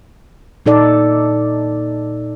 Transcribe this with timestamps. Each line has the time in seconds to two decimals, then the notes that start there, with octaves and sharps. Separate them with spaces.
0.66 A#2 D#4 A4 D5